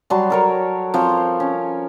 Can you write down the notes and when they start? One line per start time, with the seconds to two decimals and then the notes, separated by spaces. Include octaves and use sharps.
0.10 F#3 G3 A5 C6
0.30 A4 A#4 C#5
0.94 F3 C4 C5 C#5
1.40 C#4